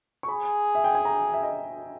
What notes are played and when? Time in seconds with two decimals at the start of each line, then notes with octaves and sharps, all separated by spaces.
0.23 C#6
0.28 G#4 B5
0.75 E5
0.84 G5
0.95 G#5
1.05 A#5
1.34 E5
1.43 D#5